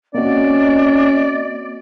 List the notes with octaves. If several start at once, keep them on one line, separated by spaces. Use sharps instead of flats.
A#3 C4 C#4 F#4 D5 D#5